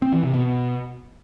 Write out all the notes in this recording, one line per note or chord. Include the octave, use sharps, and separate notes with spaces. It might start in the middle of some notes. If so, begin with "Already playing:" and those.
C4
E3
C3
B2